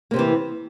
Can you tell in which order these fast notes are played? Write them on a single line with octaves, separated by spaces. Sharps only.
A#3 C3 C4 E3